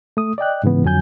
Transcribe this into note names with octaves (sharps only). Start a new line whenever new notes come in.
A3 D#6
D5 D#5 G5 F#6
G#2 C#3 E3 B3
F2 D3 F#3 G#5 G6